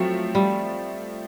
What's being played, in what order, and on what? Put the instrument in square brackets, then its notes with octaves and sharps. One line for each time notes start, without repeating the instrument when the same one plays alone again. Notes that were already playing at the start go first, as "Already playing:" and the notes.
Already playing: [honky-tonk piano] F3 A3 C4 [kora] F#3
[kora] G3